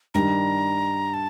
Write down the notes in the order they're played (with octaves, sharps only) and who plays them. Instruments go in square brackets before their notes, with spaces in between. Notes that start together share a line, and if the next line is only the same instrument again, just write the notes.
[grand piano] G2 D#3 G3 D4 [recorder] A#5
[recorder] A5